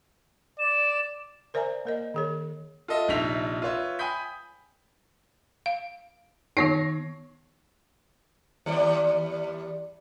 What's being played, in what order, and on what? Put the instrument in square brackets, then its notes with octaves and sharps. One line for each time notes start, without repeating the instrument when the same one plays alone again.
[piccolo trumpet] D5 [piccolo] E7
[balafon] A#4 C5 D5 E5 G#5 A#5
A#3 A#4 D#5
D#3 G#4 C#5
[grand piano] F4 A4 D#5 E5
A#1 C3 D#4 E5 B6 F7
F4 B4 C#5 E5
G5 G#5 B5 D#6 G6 B6
[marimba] F5
[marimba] D#3 B3 D#4 [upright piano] C#5 A#6 C7
[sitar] D#2 G3 D5